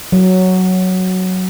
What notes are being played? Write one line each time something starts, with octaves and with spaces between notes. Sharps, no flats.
F#3